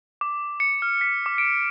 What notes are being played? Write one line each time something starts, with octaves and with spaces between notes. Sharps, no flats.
D6
C#7
F6
B6
D6
D7